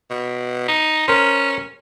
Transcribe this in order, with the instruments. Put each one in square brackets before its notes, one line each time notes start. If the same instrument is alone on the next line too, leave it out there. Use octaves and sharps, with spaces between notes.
[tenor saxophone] B2
D#4
[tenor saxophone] C#4 [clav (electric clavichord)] A#4 C5